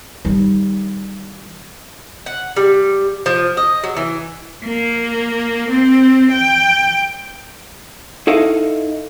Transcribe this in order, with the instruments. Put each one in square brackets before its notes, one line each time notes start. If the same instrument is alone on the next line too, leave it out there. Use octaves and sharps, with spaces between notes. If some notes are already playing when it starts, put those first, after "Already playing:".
[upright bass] D#3 G3
[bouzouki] F#5
G3
F3
D#5
F#3
E3
[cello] A#3
C4
G5
[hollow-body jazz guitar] D#4 E4 A4 D#5 F5